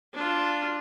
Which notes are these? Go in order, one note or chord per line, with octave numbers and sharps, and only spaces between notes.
D4 F4